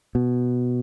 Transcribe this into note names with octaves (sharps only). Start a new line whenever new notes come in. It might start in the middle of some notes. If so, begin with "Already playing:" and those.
B2